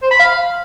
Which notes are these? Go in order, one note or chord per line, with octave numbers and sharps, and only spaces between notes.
C5
B5
F5